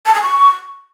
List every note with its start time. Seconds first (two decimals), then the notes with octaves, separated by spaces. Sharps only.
0.06 A5
0.14 G#5
0.22 C#6